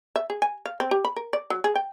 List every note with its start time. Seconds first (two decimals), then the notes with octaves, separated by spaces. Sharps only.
0.16 E5
0.30 G#4
0.42 G#5
0.66 F5
0.80 C4
0.91 G4
1.05 B5
1.16 A#4
1.33 D5
1.50 F#3
1.64 G#4
1.75 G5